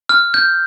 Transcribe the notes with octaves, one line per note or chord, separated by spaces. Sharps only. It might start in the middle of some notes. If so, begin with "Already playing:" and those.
F6
G6